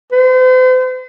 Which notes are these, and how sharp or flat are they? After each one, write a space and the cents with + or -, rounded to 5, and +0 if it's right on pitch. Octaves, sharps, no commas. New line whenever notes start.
C5 -40